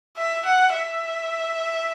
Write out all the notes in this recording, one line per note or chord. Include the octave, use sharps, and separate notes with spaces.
E5
F#5
E5